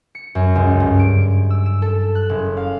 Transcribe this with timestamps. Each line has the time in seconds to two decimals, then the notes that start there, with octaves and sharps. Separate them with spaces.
0.15 C#7
0.35 F#2
0.55 C#2
0.80 G2
0.99 D7
1.50 E6
1.66 E7
1.82 A4
2.15 F#6
2.29 F#1
2.57 F5